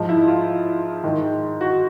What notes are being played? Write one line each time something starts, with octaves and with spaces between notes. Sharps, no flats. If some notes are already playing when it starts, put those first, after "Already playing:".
Already playing: G#2 F3
E4
F4
G#2 D#3
F#4